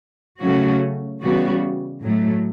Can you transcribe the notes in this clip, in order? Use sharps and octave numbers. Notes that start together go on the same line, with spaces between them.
C#3 F#3 A3 C#4 F#4
C#3 E3 G3 B3 F#4
A2 F#3 A3